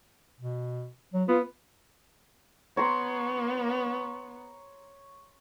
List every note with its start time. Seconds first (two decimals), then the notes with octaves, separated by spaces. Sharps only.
0.41 B2
1.14 F#3
1.29 B3 F4
2.77 B3 C#5 A#5 C6